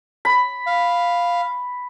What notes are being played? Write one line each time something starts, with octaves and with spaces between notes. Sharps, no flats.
B5
F5